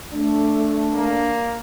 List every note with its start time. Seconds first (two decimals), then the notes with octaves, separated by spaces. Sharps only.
0.11 A3 D4
0.93 A#3